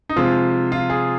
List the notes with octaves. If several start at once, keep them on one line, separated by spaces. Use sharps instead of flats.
D#4
C3 F3 G#3 F4
F4
G#4